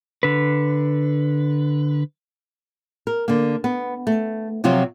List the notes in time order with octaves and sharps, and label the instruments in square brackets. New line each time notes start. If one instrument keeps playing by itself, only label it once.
[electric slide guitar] D3 B4
[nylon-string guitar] A#4
D3 A#3
B3
A3
C3 F3 F#3 F4 F#4